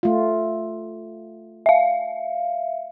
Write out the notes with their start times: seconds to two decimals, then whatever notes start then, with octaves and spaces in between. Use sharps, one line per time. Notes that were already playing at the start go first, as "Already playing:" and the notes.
0.03 A3 F4
1.66 E5 F5